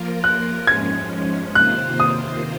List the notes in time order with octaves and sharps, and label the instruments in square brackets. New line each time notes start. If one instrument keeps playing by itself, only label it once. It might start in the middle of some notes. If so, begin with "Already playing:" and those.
Already playing: [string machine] F3 A#3 F4 A#4
[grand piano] F#6
[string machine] G#2 F3 G#3 C#4 [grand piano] G#6
[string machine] C3 D#3 A#3 F4 C5 [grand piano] F#6
[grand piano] D#6